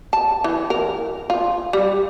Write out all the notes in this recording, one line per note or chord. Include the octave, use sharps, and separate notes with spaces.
A5
E3
A#4
F4
G3